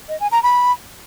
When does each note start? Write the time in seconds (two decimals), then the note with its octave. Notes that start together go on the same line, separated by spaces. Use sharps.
0.09 D#5
0.20 G#5
0.32 A#5
0.43 B5